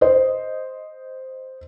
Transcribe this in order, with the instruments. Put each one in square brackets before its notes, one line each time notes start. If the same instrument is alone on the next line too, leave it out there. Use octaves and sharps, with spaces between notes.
[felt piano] C5 D#5